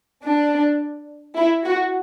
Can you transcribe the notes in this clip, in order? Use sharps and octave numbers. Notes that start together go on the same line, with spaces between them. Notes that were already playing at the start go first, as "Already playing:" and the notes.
D4
E4
F#4